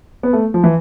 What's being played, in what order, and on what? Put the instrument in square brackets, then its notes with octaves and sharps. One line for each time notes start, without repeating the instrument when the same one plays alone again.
[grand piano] B3
A3
F3
E3